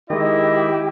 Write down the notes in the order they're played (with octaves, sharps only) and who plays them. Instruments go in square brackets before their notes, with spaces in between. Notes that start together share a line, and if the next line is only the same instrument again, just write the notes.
[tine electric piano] D#3 G#3 [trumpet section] E4 [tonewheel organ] G4 [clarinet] D#5